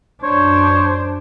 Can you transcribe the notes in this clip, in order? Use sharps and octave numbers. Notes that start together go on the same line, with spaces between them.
F#2 D4 C5 C#5